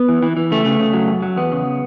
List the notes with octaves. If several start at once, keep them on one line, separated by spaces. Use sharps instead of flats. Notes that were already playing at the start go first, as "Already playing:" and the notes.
Already playing: B3
E3
E3
E3
C#3 A3
C#3
C#3
F#3
F#2
F#3
E2 B3
C#3